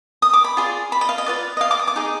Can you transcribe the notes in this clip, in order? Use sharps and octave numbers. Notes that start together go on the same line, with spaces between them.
D#6
D6
B5
F4 G#4 D5
B5
D#5
F5
D#5
F4 B4 D5
D#5
F5
D6
D#6
D6
D#4 G#4